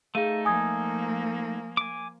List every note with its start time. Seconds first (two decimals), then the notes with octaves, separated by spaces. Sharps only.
0.15 A3 D#4 G#4 F5 D#7
0.45 F3 A#3 G#5 D#6 G#6
1.77 G#5 D6